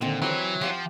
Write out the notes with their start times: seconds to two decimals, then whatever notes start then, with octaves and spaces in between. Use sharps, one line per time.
0.01 A#2 D3 D#3 C4
0.22 E3 F#3 E4 G4 C5
0.61 F3 G4 F5 F#5